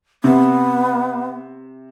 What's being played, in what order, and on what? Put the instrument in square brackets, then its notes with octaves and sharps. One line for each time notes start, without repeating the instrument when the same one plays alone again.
[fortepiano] C3 [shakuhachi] B3